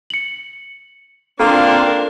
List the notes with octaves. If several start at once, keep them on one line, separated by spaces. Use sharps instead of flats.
C#7 F#7
A#3 C4 D4 F4 A4 A#4 G5 C6